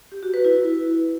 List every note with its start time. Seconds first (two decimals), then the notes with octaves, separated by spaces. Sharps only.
0.12 G4
0.23 F#4
0.34 B4
0.45 E4